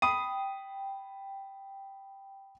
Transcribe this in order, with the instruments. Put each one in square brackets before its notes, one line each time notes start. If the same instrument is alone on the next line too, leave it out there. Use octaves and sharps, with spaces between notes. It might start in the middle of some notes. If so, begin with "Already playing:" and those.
[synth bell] G5 [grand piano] B5 D#6 D#7